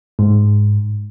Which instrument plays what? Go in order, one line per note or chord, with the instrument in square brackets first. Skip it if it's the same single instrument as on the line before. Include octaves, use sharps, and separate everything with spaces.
[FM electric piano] G#2